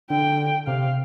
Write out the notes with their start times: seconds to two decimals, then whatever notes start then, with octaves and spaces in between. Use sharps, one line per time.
0.10 D3 G5
0.67 C3 F5